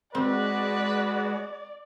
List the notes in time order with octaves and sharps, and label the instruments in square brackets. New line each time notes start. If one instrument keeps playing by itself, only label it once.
[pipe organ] G#3 F#4 [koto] C4 [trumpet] B4 [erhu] D5